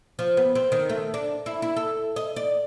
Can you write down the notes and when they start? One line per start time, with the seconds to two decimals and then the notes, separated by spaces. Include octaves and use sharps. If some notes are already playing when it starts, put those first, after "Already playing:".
0.19 F3
0.37 B3
0.55 C4
0.72 D#3
0.89 A3
1.14 D4
1.46 E4
1.62 E4
1.76 A4
2.16 D#5
2.36 D5